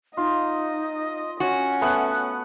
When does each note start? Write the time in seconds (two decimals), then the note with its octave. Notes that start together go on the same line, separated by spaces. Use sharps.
0.17 D#4 F4 D#5
1.40 C#4 F#4 G#5
1.81 A3 B3 F#5